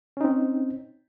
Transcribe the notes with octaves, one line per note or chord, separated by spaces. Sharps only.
C4 C#4 D#4